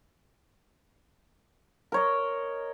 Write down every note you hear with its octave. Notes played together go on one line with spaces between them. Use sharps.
A#4 C#5 D#5